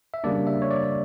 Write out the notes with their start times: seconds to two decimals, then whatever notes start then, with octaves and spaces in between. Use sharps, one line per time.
0.14 E5
0.24 C#3 G3 A#3 D4 D5
0.47 E5
0.62 C#5
0.71 D5